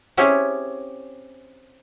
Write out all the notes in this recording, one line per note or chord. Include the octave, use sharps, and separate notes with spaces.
C4 C#4 E4 G4 G#4 C#5